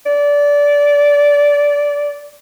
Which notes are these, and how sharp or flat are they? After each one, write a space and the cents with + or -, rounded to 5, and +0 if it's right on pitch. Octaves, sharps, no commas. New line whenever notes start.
D5 -20